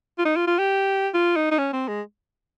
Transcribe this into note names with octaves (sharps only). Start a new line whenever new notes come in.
F4
D#4
F4
F4
G4
F4
D#4
D#4
C#4
C4
G#3